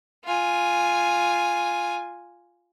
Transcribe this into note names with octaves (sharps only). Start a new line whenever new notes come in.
F4 G#5